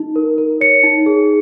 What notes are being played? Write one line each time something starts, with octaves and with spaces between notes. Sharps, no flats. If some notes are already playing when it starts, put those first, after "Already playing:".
Already playing: D#4
A#4
A#4
C#5 C#7
D#4
G#4